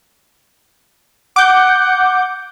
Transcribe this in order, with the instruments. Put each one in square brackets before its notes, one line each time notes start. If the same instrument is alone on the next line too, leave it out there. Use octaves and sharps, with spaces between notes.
[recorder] F#5 [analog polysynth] D6 G6